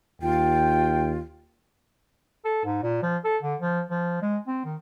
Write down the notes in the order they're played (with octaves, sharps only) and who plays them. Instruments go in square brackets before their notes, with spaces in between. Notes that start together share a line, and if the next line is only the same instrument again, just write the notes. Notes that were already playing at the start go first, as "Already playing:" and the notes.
[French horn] D#2 [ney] F4 [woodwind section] G5
[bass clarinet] A4
G#2
A#2
F3
A4
D3
F3
F3
G#3
C4
D#3